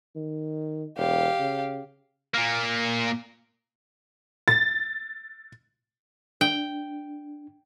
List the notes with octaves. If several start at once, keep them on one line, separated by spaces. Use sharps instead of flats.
D#3
E1 G4 F5
C#3
A#2 A#3
A6
D4 G5